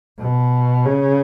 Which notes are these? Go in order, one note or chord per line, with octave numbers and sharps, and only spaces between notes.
B2
C#3